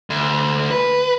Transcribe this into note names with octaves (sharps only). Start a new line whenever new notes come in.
D2
B4